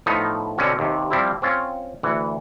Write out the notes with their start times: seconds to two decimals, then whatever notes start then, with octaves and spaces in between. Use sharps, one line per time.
0.06 A2 F3 B3 D#4
0.58 B2 D3 C4 C#4 F#4
0.79 D#2 C3
1.10 F3 G3 C4 E4
1.42 C4 C#4 F4
2.03 D2 E3 F#5